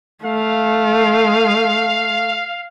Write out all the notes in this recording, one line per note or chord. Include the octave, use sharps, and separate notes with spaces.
A3 F5